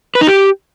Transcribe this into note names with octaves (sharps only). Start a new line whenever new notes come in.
B4
D#4
G4